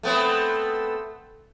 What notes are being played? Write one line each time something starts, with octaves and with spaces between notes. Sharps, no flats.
A3 B3 C4